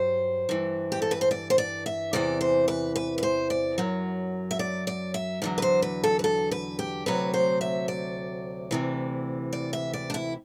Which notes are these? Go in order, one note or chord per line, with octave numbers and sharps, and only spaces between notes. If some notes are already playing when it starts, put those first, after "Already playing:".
Already playing: G2 F#3 C5
G2 E3
G4
A4
B4
C5
D5
C5
D5
E5
E2 C3 E3 D5
C5
B4
B4
B4
C5
D5
F#2 F#3
E5
D5
D5
E5
E2 D3 F#3
B4
C5
B4
A4
B4
A4
B4
G4
D2 C3 F#3 B4
C5
E5
D5
D2 C3 E3
D5
E5
D5
D4
E4